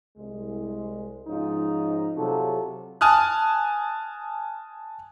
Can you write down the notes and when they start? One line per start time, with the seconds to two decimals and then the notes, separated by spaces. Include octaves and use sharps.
0.17 C2 G#3
1.27 G#2 F3 C#4 D#4
2.16 C3 F#3 F4 F#4 G#4 A4
3.01 G#5 A5 D#6 F6 F#6